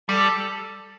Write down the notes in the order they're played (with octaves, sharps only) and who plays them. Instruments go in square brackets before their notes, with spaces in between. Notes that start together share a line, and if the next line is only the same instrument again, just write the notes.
[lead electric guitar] G3 [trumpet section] A4